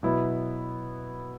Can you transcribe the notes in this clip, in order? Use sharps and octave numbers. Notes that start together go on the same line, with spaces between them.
B2 F#3 B3 E4